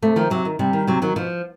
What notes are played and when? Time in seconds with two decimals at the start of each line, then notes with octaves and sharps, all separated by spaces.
0.02 C3 A3
0.16 D#3 F3
0.30 C3 F#3
0.45 D#3
0.59 C3 G3
0.73 D#3
0.87 C3 F#3
1.02 D#3 F#3
1.16 B2 F3